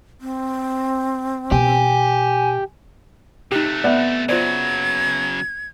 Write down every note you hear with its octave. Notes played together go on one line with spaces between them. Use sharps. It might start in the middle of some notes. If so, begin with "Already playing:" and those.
C4
B2 E3 G4 G#5
C3 A3 D#4 G4 F#6
B3 D5 E5
C#3 F#3 F4 C5 D5 G#6